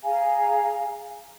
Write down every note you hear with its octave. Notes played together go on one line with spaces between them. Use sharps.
G#4 F5 G#5 A#5